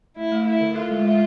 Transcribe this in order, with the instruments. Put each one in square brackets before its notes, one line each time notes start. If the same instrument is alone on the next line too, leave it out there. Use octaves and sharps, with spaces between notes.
[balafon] A3 [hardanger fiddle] E4
[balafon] A3
[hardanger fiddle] E4 [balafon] A4
[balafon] D3
[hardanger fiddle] F4 [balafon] A4
[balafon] G#3
G#3